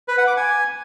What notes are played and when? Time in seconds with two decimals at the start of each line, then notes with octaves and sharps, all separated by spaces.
0.08 B4
0.18 F#5
0.27 D6
0.37 G#5